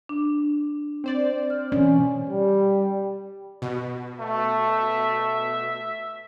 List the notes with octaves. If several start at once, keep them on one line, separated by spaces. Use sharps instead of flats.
D4
C4 C5 D5
F6
B2 E3 C#4
G3
B2
A3 E5